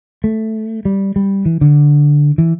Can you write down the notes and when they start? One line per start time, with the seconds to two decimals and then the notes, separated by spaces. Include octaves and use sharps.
0.24 A3
0.85 G3
1.16 G3
1.46 E3
1.61 D3
2.38 E3